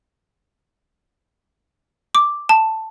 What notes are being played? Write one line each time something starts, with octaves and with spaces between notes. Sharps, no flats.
D6
A5